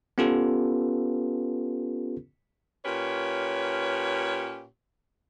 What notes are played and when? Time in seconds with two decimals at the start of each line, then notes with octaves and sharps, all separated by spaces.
0.18 B3 C#4 F4 G4 A4 B4
2.85 A#2 C#4 G4 B4 C#5